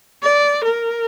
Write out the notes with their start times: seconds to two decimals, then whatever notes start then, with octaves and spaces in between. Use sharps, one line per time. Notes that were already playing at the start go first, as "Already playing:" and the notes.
0.23 D5
0.64 A#4